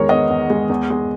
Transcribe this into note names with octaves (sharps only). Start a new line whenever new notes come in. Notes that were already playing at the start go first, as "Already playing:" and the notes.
Already playing: E2 D#3 G#3 A#4 C#5
B3 D#5
E2
G#3
E2
G#3